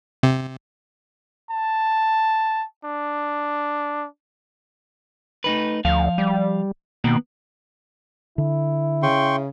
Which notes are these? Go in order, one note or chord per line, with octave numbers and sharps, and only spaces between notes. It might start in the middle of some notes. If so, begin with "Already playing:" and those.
C3
A5
D4
A3 D#4 B4
D2 F3 F5
G3
B2 D#3 A#3 B3
D3 E4
C#3 G5 C6 C#6